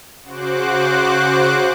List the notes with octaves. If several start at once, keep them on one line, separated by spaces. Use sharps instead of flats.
C#3 F#4 C5 D6 F#6